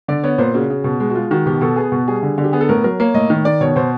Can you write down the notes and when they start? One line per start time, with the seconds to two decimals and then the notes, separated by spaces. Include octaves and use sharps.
0.08 D3 D5
0.24 B3 C#5
0.38 A#2 C5
0.54 C#3 F#4
0.70 C#3
0.84 B2
1.00 G#3
1.10 F#4
1.15 G#3 F4
1.31 D#3 F#4
1.46 B2 G4
1.61 B2 A4
1.76 B3 G#4
1.92 B2
2.08 G3 G#4
2.23 D3
2.38 D3
2.44 G4
2.53 B3 G#4
2.61 A4
2.69 A2 A#4
2.84 F#3 A#4
3.00 A#3 C#5
3.14 A2 D#5
3.30 D#3
3.45 D#3 D5
3.61 B2 C#5
3.76 B2 C5